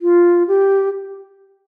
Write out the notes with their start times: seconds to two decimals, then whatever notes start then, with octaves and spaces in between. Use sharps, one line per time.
0.02 F4
0.48 G4